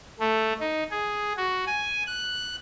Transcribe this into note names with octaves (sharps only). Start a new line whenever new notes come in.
A3
D#4
G#4
F#4
G#5
F#6